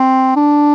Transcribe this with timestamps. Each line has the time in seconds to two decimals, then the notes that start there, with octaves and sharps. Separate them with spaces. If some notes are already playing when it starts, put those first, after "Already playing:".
Already playing: C4
0.36 D4